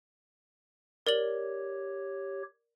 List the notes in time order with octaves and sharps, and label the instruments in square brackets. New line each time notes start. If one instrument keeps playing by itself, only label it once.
[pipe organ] G4 C#5 [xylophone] A#4 D5 F#7